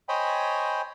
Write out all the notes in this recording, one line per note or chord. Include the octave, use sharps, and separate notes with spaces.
C5 C#5 D#5 G5 G#5 B5